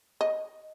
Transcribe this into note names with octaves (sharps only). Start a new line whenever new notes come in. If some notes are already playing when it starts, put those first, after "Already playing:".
D#5